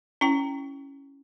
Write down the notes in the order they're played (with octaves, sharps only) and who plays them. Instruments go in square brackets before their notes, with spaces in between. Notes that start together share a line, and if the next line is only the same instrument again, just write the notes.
[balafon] C#4 E4 G5